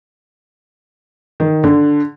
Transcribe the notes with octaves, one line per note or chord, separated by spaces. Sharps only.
D#3
D3